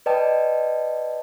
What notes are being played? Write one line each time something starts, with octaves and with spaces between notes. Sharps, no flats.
B4 D5 D#5 G5 A5